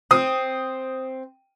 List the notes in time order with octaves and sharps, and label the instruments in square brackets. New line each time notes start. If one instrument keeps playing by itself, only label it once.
[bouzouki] C4 [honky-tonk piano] D#6